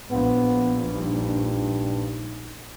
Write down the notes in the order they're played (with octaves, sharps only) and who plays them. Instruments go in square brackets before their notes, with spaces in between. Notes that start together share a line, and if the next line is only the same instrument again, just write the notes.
[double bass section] A#1 [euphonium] B3 [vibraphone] B4 F5 C6
[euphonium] G2 [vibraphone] D#4